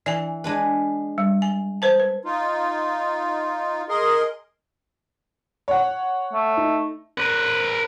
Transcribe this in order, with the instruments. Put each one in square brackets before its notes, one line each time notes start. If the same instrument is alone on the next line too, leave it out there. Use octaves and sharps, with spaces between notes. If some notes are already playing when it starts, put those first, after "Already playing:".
[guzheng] E3 [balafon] D5 G#5
[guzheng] G#3 D4 B4
[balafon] G3
G#5
B4 C5 A5
B4
[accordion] D#4 F4
G#4 A#4 D#5 C6
[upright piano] C#5 F#5
[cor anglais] A3
[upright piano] D#4
[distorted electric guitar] A#4 B4